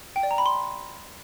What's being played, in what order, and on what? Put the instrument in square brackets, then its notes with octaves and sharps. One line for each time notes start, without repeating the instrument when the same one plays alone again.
[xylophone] G5
D5
A#5
B5
C6